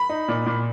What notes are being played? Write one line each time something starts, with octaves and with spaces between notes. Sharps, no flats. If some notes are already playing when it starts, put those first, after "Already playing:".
Already playing: B5
D#4
A#2
A#2